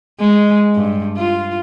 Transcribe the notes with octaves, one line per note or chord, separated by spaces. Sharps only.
G#3
G2
F4